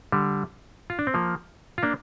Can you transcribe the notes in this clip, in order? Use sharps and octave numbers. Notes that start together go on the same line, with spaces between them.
D3 G3
F4
D4
C4
F3 A#3
F4
A#3 D4